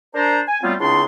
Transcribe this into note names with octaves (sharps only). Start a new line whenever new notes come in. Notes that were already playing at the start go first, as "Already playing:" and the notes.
D4 A#4 C5 A#5
G#5
F#3 G3 A3 B3 C4 F4
C#2 C#3 C4 D4 E4 C6